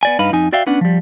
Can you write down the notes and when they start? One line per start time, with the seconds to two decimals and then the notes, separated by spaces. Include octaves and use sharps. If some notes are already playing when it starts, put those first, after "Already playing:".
0.03 B3 D5 G#5
0.19 G2 D#4 B4 F5 B5
0.33 F2 D#4 G#5
0.52 F#4 D5 E5 F5 G5
0.67 B3 C#4 D4 F#5
0.81 F3 G3